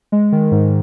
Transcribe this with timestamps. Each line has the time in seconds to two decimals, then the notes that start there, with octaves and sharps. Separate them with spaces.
0.12 G#3
0.32 D#3
0.51 G#2